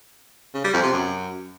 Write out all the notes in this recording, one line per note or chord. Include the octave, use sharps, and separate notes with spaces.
C#3
G3
F2
C3
F#2